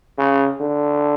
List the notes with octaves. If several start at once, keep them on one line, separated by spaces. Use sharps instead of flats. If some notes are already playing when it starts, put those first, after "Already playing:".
C#3
D3